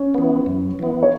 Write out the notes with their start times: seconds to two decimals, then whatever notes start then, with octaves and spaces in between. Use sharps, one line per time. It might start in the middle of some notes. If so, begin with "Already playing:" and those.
Already playing: C#4
0.14 E3 B3
0.46 F#2
0.79 E3 B3
1.03 C#5